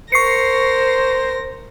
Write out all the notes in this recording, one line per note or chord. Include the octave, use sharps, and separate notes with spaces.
A#4 C5 C#6 A#6 C7 C#7